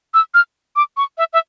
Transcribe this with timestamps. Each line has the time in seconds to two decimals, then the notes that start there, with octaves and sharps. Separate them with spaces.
0.14 E6
0.34 F6
0.76 D6
0.97 C#6
1.18 E5
1.33 E5